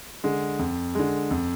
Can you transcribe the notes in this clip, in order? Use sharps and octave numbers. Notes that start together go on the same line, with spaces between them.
D3 G#3
F2
D3 G#3
F2